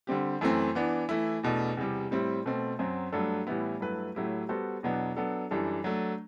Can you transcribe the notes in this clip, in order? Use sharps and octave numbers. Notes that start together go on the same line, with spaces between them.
D3 G3 C4 G4
F#2 E3 A3 C4
E3 B3 D4
E3 A3 E4
E2 B2 A3 D4
E2 C3 G3
A2 G3 C4 E4
B2 A3 C4
F#2 F#3 C4
G2 F#3 A3 D4 A4
A2 E3 G3 B3 E4
G2 F#3 A3 E4 B4
A2 F#3 A3 E4 G4
G3 B3 F#4 A4 C5
E2 B2 F#3 B3 D4
F#3 B3 D4 A4
F#2 E3 G3 D4 A4
F#3 A3 D4